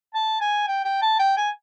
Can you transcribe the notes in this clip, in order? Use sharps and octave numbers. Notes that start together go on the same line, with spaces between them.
A5
G#5
G5
G5
A5
G5
G#5